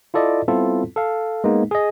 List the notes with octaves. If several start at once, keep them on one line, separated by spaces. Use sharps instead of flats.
E4 F4 A4 D5 D#5
G3 B3 C4 E4 F4 A4
A4 F5
G#3 A#3 B3 D#4
G#4 D#5